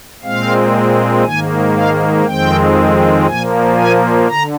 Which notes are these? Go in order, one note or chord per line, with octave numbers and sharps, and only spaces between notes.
A#2 G#3 C4 F5
G#2 D#3 A#3 G#5
F5
F2 D#3 G#3 C4 G5
A#2 F3 A#3 G#5
G#5
D3 A#5